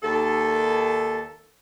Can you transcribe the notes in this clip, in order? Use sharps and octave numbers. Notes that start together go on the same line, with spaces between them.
D#2 A4